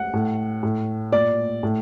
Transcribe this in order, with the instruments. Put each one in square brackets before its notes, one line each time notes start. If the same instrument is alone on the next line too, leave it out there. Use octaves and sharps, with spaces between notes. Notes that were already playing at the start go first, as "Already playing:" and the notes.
Already playing: [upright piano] F#5
A2
A2
A#2 D5
A2